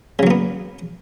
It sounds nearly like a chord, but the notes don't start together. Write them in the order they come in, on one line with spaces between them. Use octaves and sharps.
C#3 F#3 A#3 B3